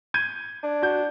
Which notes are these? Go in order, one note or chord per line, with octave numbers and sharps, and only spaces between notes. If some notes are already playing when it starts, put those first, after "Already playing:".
G6 G#6 D#7
D4
F#4 G6